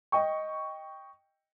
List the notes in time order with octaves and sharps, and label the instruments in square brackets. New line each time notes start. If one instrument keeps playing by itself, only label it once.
[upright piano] D#5 G5 C#6